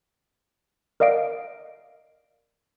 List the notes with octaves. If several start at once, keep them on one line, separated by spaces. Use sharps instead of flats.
A#4 D5 D#5 F5 D7